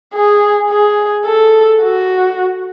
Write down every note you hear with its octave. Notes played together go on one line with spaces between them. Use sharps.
G#4
G#4
A4
F#4